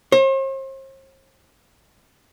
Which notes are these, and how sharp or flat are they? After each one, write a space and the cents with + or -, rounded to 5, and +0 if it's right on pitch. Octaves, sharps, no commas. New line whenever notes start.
C5 +45